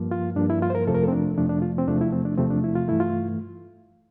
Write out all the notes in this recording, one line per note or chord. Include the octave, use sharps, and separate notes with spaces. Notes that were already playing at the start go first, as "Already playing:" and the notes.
Already playing: G2 F3 A#3
F4
G2 F3 A#3 D4
E4
F4
C5
A#4
F2 C3 F3 A3 A4
A#4
A4
C4
D4
F2 C3 F3 A3 D4
D4
F4
C4
E2 C3 F3 A3 D4
E4
C4
D4
E2 C3 F3 A3 C4
D4
E4
F4
G2 E3 A3 E4
F4